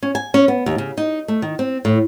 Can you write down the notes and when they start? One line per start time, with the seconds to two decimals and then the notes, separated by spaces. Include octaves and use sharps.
0.03 C#4
0.15 G#5
0.34 C#4
0.48 B3
0.66 D#2
0.78 C#3
0.98 D#4
1.28 A3
1.42 D#3
1.59 C4
1.85 A2